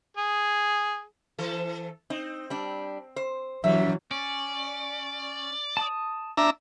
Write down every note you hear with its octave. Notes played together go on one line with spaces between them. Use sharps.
G#4
E3 A4
C4 D#4
G3 D4
C5
F#2 E3 F#3 G3 E5
C#4 D5
A5 D#6
D4 E5 A#5